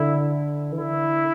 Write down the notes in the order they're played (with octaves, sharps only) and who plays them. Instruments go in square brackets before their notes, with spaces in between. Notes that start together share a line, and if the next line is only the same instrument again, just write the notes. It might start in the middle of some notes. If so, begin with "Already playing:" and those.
Already playing: [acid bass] D3 [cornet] E4
[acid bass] E3
[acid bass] D3 [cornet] E4